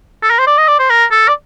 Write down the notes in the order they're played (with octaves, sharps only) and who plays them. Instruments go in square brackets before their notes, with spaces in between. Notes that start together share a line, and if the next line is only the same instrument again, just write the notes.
[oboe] A4
A#4
C5
D5
D#5
D5
C5
A#4
A4
D5